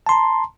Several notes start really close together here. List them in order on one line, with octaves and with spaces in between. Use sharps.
A5 C6 A#5